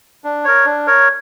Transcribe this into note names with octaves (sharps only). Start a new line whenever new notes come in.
D4
A#4 C#5
D4
A#4 C#5